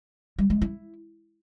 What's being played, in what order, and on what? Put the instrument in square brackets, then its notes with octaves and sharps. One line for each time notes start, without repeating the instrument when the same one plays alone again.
[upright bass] G3
G#3
E4